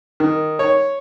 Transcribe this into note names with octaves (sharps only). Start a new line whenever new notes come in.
D#3
C#5